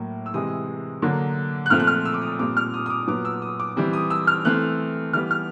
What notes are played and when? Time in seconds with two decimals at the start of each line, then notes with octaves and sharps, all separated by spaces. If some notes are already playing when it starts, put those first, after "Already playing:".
Already playing: A2 F#3 A#3
0.26 E6
0.34 C3 E3 G#3 D#6
1.02 D3 F#3 A#3
1.66 F#6
1.70 A#2 F3 A3 C4 F6
1.80 F#6
1.87 F6
2.05 E6
2.14 D6
2.22 D#6
2.39 A#2 G3 C4 D6
2.57 F6
2.74 D#6
2.86 D#6
2.90 D6
3.07 A#2 F#3 B3 D6
3.25 E6
3.42 D#6
3.60 D6
3.77 E3 G3 C4
3.93 D#6
4.10 E6
4.27 F6
4.45 E3 A3 C4 F#6
5.13 E3 G3 B3 F6
5.31 F6